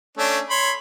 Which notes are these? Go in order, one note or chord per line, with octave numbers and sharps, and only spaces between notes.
A3 C#4 D4
C#5 B5 C6